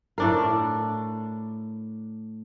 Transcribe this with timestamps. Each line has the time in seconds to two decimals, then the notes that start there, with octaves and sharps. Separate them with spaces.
0.18 A2 D4 A#4